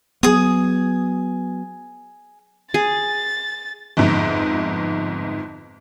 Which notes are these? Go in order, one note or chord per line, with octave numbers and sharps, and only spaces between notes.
F#3 B3 G#4 D#6
G#4 A6
G1 F2 G#2